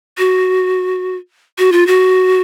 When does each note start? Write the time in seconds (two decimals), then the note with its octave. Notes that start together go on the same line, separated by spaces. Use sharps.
0.18 F#4
1.59 F#4
1.72 F4
1.87 F#4